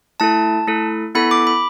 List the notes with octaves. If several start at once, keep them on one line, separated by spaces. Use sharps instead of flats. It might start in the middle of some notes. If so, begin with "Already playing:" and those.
A3 E4 A4 A5
A3 E4 A4
B3 E4 A4 B5
D6
B5